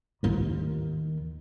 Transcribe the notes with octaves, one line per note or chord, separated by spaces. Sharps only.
D#2 D#3